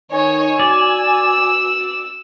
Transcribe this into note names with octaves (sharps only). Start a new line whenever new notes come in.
D#3 D#4 C#5 G#5
F#4 D5 E6